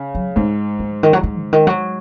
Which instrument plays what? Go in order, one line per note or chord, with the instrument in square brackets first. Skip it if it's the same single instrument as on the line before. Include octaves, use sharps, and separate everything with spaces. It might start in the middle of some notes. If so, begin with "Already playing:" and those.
Already playing: [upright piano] C#3
[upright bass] F#3
[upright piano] G#2 [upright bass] G#3
[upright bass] A#3
C#3
D#3
F#3
G#3
C#3
D#3
F#3